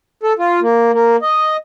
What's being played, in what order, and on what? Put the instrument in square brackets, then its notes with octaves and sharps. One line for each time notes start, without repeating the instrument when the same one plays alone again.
[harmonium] A4
F4
A#3
A#3
D#5